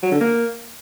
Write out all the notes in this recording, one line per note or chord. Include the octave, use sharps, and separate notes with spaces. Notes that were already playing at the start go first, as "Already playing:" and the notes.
F#3
D3
A#3